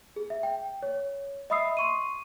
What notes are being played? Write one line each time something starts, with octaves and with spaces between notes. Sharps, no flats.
G#4
E5
G5
C#5
D#5 E5 B5 D#6 E6 C7
C6 C#6 D#7